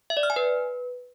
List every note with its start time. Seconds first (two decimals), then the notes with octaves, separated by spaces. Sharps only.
0.10 E5
0.17 D5
0.23 F6
0.30 G#5
0.36 B4